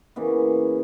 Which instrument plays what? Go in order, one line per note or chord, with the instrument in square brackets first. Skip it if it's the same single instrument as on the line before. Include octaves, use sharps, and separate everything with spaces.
[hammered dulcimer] C#3 E3 A#3 B3